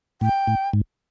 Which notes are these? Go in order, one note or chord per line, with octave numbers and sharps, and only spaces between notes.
A2 G5
A2
G#2